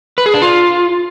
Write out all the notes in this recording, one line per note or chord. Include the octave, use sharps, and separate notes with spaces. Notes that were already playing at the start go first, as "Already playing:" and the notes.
B4
G#4
D4
F4